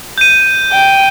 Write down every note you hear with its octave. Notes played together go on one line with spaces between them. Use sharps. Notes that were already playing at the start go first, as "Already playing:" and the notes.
G6 D#7
G5